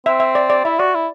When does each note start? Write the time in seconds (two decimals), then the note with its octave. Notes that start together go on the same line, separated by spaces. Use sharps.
0.06 C4 E5
0.20 E5
0.35 D5
0.50 D5
0.64 E4 E5
0.79 F#4 D5
0.94 E4